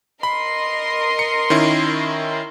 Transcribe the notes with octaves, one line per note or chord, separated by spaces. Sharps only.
A#4 D#5 B5 C6
C#7
D#3 C#4 E4